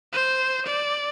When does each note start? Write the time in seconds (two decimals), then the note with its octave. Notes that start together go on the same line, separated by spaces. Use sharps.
0.13 C5
0.66 D5